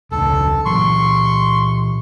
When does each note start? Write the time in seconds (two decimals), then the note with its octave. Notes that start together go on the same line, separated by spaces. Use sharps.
0.11 E1 C#2 D4 A4
0.66 A#2 E3 F#3 C6 C#6